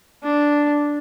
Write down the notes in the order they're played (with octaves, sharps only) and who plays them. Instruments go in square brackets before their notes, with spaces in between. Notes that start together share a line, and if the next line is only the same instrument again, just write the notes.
[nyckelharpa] D4